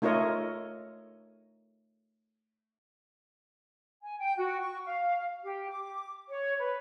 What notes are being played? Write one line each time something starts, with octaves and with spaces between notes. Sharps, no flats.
A3 D#4 F4 A#4 C#5 D#5
G#5
G5
F#4
C#6
F5
G4
D6
C#5
B4